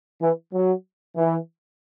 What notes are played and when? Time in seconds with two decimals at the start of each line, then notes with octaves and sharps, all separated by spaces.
0.21 E3
0.53 F#3
1.17 E3